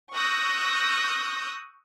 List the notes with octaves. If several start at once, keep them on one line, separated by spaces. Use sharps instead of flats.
C#6 D#6 E6 F#6 G6 A#6